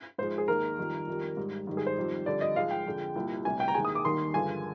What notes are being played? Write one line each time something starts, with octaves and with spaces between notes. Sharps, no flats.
G#2 F3 G#3 C5
G#4
D#2 D#3 G#3 A#4
F2 D#3 G3
F2 D#3 G3
G#2 G3
G#2 D#3 G3
G#4
C5
F2 D#3 G3
F2 D3 G3 D5
D#5
G#2 F3 G#3 F5
G5
F2 D3 G#3
C2 A#2 G3
D2 C3 G3 G#5
G5
A#5
D#2 D#3 G#3 G#5
D#6
D6
D#2 D#3 G3 C6
G2 D3 F3 G#3 G#5